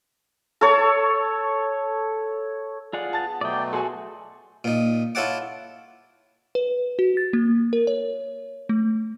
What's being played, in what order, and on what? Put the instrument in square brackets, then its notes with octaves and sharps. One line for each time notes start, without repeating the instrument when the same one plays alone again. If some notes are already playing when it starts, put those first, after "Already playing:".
[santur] A4 C#5
[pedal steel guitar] F4 G#4 F#5 [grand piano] D5
[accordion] B3 [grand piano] A5 A6
[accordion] B2 F#3 A3 [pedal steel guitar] D5 G5 [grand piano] D#6
[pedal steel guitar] F#4 G#4 A4 [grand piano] G#5 C6
[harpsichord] A#2 D#4
E4 F4 A4 C#5 F#5 D6
[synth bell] B4
F#4
A6
A#3
A#4
C#5
A3